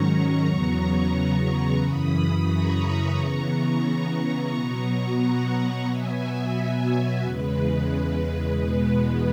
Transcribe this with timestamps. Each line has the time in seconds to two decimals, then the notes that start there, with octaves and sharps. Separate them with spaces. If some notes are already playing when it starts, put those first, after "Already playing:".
Already playing: G#2 D#3 F#3 C#4 A#5 C#6
0.45 E2 C#3 F#3 B3
1.13 A#5 C#6
1.80 F#2 C#3 E3 B5 D#6
2.47 A#5 C#6
3.15 C#3 E3 B3 A#5 C#6
4.50 B2 F#3 B3
5.17 F#5 A#5
5.85 B2 F#3 B3 E5 G#5
7.21 E2 C#3 G#3 B4
8.55 E2 B2 G#3 B3 B4